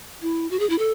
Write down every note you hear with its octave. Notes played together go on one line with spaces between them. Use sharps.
E4
F#4
G#4
E4
A4